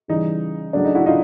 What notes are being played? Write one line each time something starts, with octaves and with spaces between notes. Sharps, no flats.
C#3 E3 G3 D#4
C#3 F#3 A3 D4
D#4
E4 F#4
D#4 F4